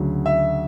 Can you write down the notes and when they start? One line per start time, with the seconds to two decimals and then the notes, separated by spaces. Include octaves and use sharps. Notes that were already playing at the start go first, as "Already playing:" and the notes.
Already playing: D2 C#3 F#3
0.26 E5